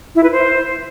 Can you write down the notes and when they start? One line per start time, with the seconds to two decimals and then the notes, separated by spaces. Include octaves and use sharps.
0.15 E4
0.24 B4
0.32 C5